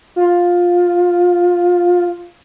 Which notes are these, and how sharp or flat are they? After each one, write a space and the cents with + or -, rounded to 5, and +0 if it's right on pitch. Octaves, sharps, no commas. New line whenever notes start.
F4 +15